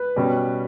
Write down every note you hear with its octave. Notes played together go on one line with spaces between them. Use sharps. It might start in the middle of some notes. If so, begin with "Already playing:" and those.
Already playing: B4
B2 G3 C#4